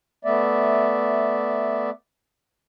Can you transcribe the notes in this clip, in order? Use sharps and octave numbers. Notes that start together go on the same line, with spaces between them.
A3 B3 D5 E5